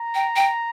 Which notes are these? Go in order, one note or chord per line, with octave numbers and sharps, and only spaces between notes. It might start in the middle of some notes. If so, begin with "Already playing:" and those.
Already playing: A#5
G5
G5